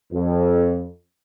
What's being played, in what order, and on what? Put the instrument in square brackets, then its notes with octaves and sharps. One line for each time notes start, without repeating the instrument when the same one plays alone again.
[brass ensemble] F2